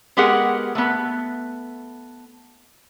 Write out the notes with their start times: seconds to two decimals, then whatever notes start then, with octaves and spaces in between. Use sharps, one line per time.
0.17 G#3 B3 G4 G#4 A#4 F#5
0.75 A3 B3